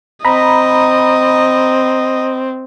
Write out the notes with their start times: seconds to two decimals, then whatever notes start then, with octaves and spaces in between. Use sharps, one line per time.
0.25 C4 D#5 A#5 B5